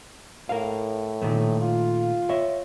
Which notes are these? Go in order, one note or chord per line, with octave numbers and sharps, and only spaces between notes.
A2 A#4 F5
A#2 D#3 A3
F4
C#5 E5